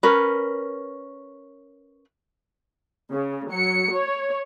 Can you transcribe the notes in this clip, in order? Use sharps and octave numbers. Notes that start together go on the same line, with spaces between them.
C#4 A#4 B4
C#3
F#3 C#7
C#5